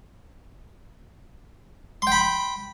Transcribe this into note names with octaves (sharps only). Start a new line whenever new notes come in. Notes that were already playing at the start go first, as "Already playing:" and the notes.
G5 B5 C6